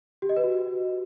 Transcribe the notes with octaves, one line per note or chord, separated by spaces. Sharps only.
G4
D#5
B4
F#4